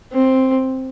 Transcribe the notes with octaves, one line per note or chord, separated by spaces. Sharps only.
C4